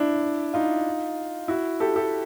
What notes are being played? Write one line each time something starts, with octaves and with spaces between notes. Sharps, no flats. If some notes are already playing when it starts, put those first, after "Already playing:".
Already playing: D4 E4
D#4 F4
E4 F#4
G4 A4
G4 A4